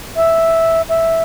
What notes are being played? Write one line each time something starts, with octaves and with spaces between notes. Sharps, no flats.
E5
E5